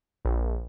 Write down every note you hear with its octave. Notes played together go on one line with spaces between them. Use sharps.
A#1